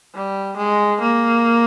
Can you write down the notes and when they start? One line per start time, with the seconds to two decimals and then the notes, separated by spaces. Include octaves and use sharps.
0.14 G3
0.57 G#3
1.01 A#3